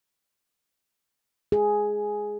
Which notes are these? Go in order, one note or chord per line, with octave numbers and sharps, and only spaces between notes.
G#4